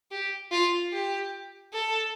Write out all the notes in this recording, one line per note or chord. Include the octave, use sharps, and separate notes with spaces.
G4
F4
G4
A4